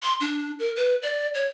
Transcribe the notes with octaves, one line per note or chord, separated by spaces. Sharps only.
C6
D4
A#4
B4
D5
C#5